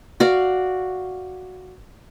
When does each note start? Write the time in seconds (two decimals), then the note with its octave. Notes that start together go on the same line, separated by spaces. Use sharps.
0.20 F#4 D5 F5